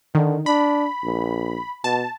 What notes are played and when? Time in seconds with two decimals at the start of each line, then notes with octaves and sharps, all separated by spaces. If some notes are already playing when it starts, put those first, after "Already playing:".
0.15 D3 D#3
0.46 D4 B5
1.03 A#1
1.84 B2 A5